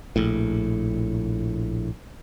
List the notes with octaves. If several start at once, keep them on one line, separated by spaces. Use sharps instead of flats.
A#1 A2